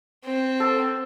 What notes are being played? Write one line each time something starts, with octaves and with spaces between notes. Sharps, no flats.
C4
A4